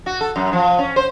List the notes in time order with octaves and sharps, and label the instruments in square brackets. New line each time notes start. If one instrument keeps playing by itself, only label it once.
[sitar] F#4
A4
F#2
F3
C#4
C5